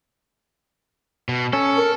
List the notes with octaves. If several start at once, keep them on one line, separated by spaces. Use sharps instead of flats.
B2
C#4 A4
A#4